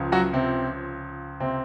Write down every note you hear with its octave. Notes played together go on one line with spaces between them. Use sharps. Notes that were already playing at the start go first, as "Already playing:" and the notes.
Already playing: C#2 C#3 F3
F#3 F#4
C3 C4
C3 C4